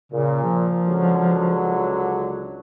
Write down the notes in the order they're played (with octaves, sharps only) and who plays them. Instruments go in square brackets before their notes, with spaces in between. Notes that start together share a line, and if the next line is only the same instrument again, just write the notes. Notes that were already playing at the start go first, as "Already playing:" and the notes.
[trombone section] A#2 [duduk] C#3
[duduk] F3
[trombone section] C#2 D3 F#3